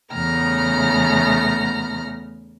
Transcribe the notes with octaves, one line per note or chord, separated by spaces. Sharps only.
E2 C#3 A3 B3 A#5 F6